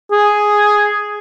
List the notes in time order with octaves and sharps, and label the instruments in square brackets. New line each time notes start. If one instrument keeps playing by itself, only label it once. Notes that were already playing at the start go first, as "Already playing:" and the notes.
[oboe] G#4